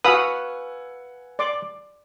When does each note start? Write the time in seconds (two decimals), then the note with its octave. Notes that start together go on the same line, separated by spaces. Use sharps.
0.04 F#4 B4 F5 F#5 G#5 B5 D#6 E6
1.39 D5 C6 D6